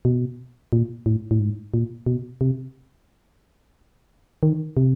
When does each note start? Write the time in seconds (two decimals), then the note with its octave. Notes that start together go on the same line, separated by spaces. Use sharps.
0.05 B2
0.73 A#2
1.06 A2
1.31 A2
1.40 G#2
1.74 A#2
2.06 B2
2.41 C3
4.43 D#3
4.77 C3